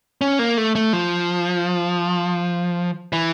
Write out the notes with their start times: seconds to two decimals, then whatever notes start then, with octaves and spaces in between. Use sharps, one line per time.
0.21 C#4
0.39 A#3
0.58 A3
0.75 A3
0.93 F3
3.13 E3